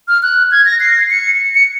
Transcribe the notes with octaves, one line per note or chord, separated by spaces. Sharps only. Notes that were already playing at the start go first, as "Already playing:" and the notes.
F6
F#6
G#6
A#6
C7
C#7
C#7